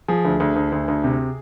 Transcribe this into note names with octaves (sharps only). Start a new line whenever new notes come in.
F3 G#4
D2
D2
D2
D2
D2
C3